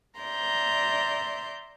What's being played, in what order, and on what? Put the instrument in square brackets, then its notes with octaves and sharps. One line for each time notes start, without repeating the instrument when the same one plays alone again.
[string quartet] D5 E5 A#5 C6 G6